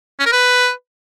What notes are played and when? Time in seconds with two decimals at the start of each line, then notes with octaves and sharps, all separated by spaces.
0.19 C#4
0.26 A#4
0.32 B4